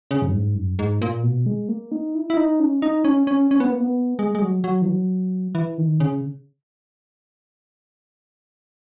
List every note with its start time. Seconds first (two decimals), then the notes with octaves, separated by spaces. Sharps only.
0.11 C#3
0.22 F#2
0.33 G#2
0.55 F#2
0.79 G#2
1.02 A#2
1.23 B2
1.46 G#3
1.69 A#3
1.92 D#4
2.15 E4
2.30 E4
2.37 D#4
2.60 C#4
2.82 D#4
3.04 C#4
3.27 C#4
3.51 C#4
3.60 B3
3.71 A#3
3.80 B3
4.19 G#3
4.35 G#3
4.42 F#3
4.64 F#3
4.82 E3
4.87 F#3
5.55 E3
5.78 D#3
6.00 C#3